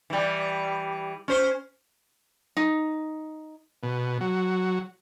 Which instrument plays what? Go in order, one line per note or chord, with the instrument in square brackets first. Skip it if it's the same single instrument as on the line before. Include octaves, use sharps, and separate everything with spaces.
[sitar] E3 G3
C#4 C5
[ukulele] D#4
[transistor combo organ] B2
F#3